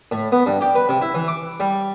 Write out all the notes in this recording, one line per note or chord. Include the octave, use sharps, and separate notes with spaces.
A2
B3
G2
G4
B4
C3
E4
E3
D6
G3